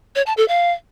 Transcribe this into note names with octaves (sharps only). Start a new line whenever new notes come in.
C#5
A5
A4
F5